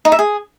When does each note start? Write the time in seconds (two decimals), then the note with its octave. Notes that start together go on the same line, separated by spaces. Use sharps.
0.05 D#4
0.12 E5
0.19 G#4